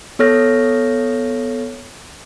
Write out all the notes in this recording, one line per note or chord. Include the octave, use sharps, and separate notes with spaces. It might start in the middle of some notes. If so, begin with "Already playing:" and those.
B3 A4 C#5 F6 A#6